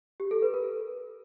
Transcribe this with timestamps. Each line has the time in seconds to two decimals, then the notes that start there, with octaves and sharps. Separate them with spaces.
0.20 G4
0.31 A4
0.42 B4
0.54 A#4